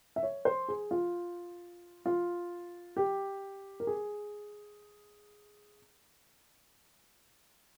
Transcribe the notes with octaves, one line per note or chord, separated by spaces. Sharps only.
E5
C#5
C5
G#4
F4
F4
G4
A#4
G#4